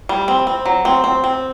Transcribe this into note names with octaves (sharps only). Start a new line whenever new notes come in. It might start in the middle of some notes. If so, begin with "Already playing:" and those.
G3
C4
C4
F#3
C4
C4
C4